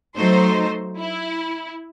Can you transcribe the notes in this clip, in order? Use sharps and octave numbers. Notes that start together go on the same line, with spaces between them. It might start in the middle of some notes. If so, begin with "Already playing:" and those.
F#3 A3 D#4 C5
E4